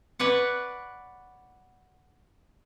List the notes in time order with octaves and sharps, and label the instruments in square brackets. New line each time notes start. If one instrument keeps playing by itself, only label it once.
[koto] B4 C#5 D5 F#5